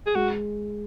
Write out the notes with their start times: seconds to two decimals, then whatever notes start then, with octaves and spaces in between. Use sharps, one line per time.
0.07 G#4
0.15 G#3 F#4